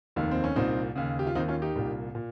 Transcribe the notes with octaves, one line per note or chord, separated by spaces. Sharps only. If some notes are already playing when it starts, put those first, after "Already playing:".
F1 D#2 D#3
C4
C#4
C2 A#2 C4 D#4
D#2 C#3
G4
F4
D#2 D#3 C4 D#4
C#4 F4
D#4 G4
C2 A#2
A#2